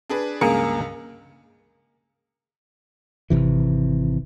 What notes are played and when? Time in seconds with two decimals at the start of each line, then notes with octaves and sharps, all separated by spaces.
0.09 D4 G#4 B4
0.41 C#2 G2 A#3 G#4 A#4 C#7
3.30 G#1 D2 C3 E3